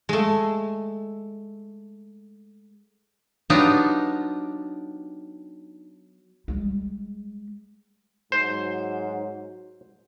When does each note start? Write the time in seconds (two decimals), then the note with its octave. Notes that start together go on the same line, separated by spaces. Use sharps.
0.09 G#3 A3
3.50 F#3 B3 D4 D#4 F4 G4
6.48 G3 G#3
8.32 G#2 F#3 C5